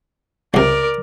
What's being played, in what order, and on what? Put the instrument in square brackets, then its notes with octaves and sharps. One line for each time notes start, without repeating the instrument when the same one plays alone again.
[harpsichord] C#2 C3 [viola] A#4 D5